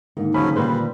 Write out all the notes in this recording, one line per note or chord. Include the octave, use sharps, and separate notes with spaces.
G#2 D3 D#3 A#3
C#3 F3 F#3 C#4 B5
A#2 G3 B4 C5